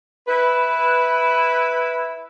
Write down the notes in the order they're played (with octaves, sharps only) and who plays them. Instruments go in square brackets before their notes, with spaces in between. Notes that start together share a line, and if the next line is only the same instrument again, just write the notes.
[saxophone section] E4 B4